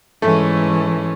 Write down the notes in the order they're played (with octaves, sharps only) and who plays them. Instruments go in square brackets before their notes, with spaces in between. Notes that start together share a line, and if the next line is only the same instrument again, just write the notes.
[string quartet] G#2 E3 G#3 C#4 [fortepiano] A3